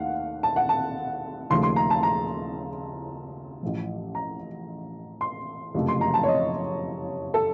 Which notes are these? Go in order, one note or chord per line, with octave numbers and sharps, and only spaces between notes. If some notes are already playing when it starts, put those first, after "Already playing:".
Already playing: D#2 D#3 A3 F5 F#5
A5
F#5
A5
D#2 C#3 F3 A3 C6
C6
A#5
A5
A#5
A1 A2 F3
A#5
C6
F#1 F2 C3 F3 A3
C6
A#5
A5
C#5
D#5
A4